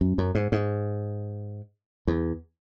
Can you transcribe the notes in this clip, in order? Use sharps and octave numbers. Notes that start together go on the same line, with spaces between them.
F#2
F#2
G#2
G#2
E2